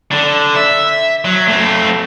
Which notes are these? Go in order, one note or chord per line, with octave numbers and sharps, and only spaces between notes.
D3
E5
F#3
A3 C4